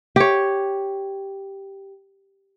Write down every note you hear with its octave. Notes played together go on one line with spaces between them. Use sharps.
G4 C#5